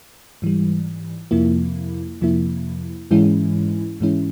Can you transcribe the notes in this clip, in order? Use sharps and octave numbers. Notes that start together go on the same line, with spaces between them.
G#2 E3 G3
F2 C3 F3 A#3 E4
F2 C3 F3 A#3 E4
G#2 E3 G#3 C#4 E4
G#2 E3 G#3 C#4 E4